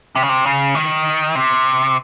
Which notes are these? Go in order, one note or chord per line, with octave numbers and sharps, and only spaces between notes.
C3
C#3
C3
C#3
D#3
C3